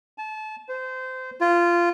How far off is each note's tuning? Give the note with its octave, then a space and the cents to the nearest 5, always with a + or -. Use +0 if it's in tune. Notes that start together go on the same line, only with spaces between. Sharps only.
A5 -30
C5 -25
F4 -15